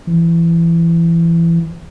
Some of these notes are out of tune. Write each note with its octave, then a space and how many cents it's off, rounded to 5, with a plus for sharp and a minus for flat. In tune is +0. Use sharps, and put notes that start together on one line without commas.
E3 +25